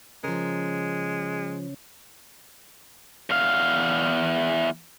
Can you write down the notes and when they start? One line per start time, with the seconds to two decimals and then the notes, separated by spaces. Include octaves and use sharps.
0.24 C#3 F3 G#3 C#4 A#4
3.30 E2 F5